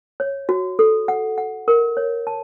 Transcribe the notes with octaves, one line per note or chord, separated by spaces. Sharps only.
C#5
F#4
A4
F#5
F#5
A#4
C#5
A5